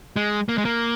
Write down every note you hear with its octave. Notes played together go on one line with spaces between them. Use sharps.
G#3
A#3
G#3
A#3